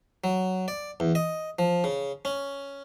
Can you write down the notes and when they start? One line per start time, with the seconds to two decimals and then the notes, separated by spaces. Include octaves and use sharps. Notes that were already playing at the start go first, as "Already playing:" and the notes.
0.24 F#3
0.68 D5
1.00 E2
1.15 D#5
1.59 F3
1.84 C#3
2.25 C#4